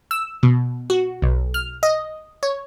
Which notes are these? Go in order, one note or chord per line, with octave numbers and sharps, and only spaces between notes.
E6
B2
F#4
B1
F6
D#5
C#5